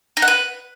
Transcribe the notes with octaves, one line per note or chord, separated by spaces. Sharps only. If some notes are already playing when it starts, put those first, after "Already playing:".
D#4
F#5
B4